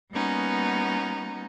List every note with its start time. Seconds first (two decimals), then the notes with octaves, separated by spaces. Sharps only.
0.12 G3 A#3 B3 C#4 D#4 F#4